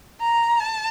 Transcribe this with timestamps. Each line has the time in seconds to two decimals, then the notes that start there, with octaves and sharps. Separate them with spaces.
0.21 A#5
0.60 A5